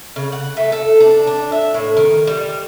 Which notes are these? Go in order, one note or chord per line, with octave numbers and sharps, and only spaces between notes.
C#3
F#5
A3
A4
D4
D4
E5
A2
D#3
G3